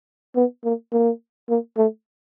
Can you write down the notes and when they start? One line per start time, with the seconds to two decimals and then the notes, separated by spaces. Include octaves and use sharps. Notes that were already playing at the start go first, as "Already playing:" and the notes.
0.36 B3
0.64 A#3
0.93 A#3
1.49 A#3
1.78 A3